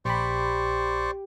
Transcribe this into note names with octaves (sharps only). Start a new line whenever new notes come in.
A#1 G4 C5 D5 B5 C#6